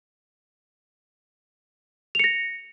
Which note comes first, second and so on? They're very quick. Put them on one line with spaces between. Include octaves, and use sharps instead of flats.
F7 C#7 A#6